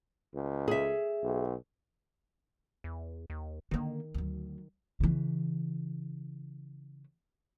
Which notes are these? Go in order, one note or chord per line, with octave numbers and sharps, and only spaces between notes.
C#2
G#4 E5
B1
E2
D#2
D3 D#3 A#3
D2 F#3
C#3 E3